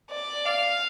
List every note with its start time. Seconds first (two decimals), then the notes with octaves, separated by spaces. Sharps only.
0.10 D5
0.45 F5